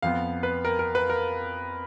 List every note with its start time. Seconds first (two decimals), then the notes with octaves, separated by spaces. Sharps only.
0.02 F2 F3 B3 F5
0.43 B4
0.65 A#4
0.79 A#4
0.95 B4
1.10 A#4